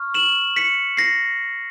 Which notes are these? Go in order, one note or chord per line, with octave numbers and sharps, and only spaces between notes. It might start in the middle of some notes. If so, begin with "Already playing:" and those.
Already playing: C#6 F6
E7 F#7
B6 C#7
A#6 C7